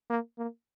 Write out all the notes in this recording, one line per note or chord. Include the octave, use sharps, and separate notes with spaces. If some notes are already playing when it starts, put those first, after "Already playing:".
A#3
A#3